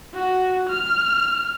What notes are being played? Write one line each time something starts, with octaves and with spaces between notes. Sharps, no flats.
F#4
F6